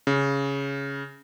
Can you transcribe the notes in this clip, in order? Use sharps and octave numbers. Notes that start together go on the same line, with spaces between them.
C#3